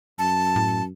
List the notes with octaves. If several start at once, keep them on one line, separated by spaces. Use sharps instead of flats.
F#2 A5
A2